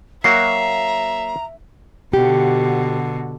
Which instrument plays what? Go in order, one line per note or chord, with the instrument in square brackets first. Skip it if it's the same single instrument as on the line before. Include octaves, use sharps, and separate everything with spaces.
[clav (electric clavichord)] F#3 A#3 F#4 [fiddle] E5 [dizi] A#5 [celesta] C7
[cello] B2 D3 [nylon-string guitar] G4